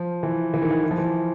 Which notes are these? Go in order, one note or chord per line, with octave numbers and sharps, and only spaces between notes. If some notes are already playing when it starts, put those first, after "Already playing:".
Already playing: F3
E3
E3
D#3
E3
E3
F3
E3